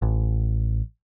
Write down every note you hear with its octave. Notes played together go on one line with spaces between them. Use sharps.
A1